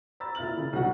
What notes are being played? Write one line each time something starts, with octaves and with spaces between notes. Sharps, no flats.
A#5 B5 E6 A6
A#2 E4 F6 A6 F#7
C#3
B1 G2 F#4 F#5